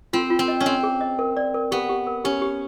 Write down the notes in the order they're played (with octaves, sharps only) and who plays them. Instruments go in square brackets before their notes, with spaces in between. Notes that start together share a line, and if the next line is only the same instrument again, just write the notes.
[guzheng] C4 [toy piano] F4
[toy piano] F4
[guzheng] C4
[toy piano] D#5
[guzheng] C#4
[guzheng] C4 [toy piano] D#5
[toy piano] G#4
D#5
A#4
D5
A#4
[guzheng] B3 [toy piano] G4
[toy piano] G4
A#4
[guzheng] C#4 [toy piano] G4
[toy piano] G4